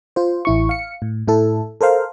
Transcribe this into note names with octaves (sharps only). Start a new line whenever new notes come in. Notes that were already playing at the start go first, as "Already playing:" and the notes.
F4 C5
A1 E4 C#6
F5 C#7
A2
A2 E4 A4
A4 A#4 C5 F5